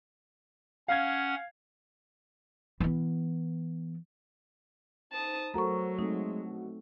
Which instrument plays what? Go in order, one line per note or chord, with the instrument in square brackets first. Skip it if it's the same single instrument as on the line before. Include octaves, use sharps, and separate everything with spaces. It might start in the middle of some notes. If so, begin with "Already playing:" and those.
[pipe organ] C#4 F#5 [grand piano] F5 G#6
[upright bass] E3 B3
[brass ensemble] D#4 C5 [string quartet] A5 D#6
[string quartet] F#3 [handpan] A3 F#4 A4 [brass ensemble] A#4 C5 [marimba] A#5 C#6
[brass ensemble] G#3 [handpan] A3 C4 [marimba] D#4
[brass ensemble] A#1 B2 F#4